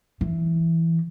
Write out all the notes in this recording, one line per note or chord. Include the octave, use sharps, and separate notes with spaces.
E3